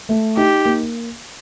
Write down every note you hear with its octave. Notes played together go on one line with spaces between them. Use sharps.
A3
D#4 G4
A#3